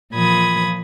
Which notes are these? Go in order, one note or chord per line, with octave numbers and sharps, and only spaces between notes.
A#2 E3 F3 B5 D#6 G#6